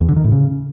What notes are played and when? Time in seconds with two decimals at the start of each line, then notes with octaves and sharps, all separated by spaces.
0.01 E2
0.09 D3
0.16 D#3
0.24 A2
0.32 C#3